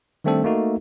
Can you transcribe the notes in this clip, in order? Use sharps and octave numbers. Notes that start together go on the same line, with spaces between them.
D#3 G3 A3 C4 D4 A4
A3 A#3 D#4 F#4